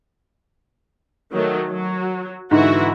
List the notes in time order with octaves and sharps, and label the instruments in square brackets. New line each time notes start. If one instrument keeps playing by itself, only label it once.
[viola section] D#3 F#3 A3
F#3
[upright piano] G#2 D3 [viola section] E3 E4 F#4